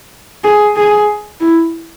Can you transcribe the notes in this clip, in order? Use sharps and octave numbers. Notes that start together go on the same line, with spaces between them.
G#4
G#4
E4